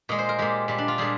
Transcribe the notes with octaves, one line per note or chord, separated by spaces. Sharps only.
A#2 G#3 D#5
C5
A#4
A#2 G#3 G4
A#2 G3
D4
F4
A#2 G3 G#4